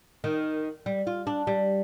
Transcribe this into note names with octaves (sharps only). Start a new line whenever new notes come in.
D#3
G3
F4
D4
G3